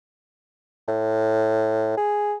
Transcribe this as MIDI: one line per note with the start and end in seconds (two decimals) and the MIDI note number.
0.88 1.94 45
1.97 2.36 68